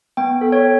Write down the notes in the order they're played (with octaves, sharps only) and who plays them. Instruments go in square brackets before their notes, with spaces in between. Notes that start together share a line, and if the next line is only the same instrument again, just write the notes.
[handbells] B3 G5
A4
C#5